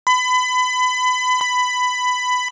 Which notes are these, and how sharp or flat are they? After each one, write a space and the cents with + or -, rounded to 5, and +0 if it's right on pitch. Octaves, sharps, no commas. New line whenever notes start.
B5 +30
B5 +15